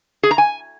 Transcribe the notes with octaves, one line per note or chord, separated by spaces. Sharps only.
G#4
A#5
G#5